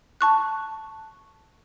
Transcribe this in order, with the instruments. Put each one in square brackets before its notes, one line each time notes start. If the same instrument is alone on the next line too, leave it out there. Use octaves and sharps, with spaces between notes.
[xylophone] A5 C#6 F#6